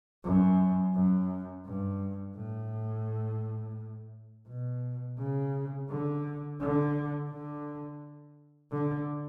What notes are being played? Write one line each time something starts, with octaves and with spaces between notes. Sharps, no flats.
F#2
F#2
G2
A2
B2
C#3
D3
D3
D3
D3